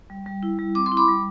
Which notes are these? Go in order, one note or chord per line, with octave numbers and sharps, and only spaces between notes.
G3
G3
E4
G3
C4 D6
C6
E4
B5 D6
G3